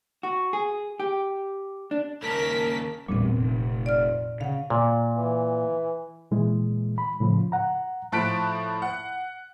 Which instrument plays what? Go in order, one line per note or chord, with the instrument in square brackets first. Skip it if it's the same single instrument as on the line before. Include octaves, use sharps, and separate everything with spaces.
[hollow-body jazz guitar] F#4
G#4
G4
D4
[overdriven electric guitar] D#2 C#3 [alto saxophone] A#3 [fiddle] A#4 [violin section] A5 B6
[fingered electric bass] A1 E2 G2 [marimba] A#2 C4
[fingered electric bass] F1
[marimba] D5 F6
[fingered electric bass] C#3 [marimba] F5 F#5
[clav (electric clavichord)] A#2
[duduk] E3
[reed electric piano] A#2 E3 G#3
B5
A2 C#3 F3
F#5 A#5
[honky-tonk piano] A2 F3 A5 F#6 B6 D7
F#5